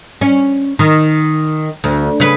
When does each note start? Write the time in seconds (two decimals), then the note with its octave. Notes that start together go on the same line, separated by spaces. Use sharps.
0.21 C#4
0.79 D#3
1.84 D2
2.20 C#3 B4